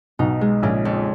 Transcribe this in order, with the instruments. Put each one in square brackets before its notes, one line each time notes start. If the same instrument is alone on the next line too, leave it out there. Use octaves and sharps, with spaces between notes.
[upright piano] B1 B2 [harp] D#4
[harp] G#3
[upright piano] A#1 A#2 [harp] C#3
[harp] F2